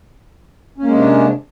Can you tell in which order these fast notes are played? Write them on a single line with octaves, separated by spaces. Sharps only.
C#4 A#3 G#3 C3 D4